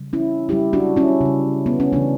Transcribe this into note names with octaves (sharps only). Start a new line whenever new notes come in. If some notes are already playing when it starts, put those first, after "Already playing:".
Already playing: C#3 G3
C#4 E4
C#3 G3 E4 G4
D4 F#4
C#4 E4
C#3 G3
B3
C#4
C#3 E3 A3 B3 D4